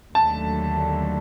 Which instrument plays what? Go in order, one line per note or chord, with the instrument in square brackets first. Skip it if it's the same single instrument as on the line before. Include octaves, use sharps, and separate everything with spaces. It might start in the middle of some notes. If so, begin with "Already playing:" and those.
[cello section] D#2 D3 F#3 A3 [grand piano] A5